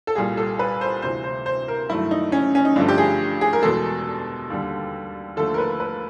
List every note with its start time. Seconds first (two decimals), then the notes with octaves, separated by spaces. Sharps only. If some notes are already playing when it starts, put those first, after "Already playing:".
0.07 A4
0.15 C2 A#2 G3 G#4
0.37 A4
0.59 B4
0.81 C5
1.02 D2 C3 E3 C5
1.24 C5
1.46 C5
1.68 A#4
1.89 G2 D#3 F#3 A3 E4
2.11 D#4
2.32 C#4
2.55 C#4
2.65 D#4
2.76 G2 D3 F3 A3 D4
2.88 G4
2.98 G#4
3.41 G#4
3.53 A#4
3.63 E2 B2 G#3 A4
4.50 D#2 D3 G3
5.36 D#2 D3 F3 A3 A4
5.54 A#4
5.58 B4
5.80 B4